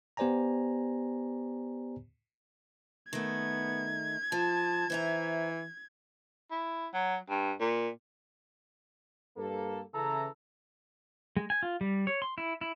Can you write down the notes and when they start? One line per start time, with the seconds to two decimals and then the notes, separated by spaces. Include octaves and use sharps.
0.17 B3 G4 C5 D5 G#5 A#5
3.13 D#3 A3 B3 G#6
4.32 F3 A5
4.90 E3 C5 E5 A#5
6.51 E4
6.94 F#3
7.30 G2
7.60 A#2
9.37 G2 A#3 A4
9.94 C#3 E3 A4 A#5
11.37 G#3
11.50 G#5
11.63 F4
11.81 G3
12.07 C#5
12.22 C6
12.38 E4
12.61 E4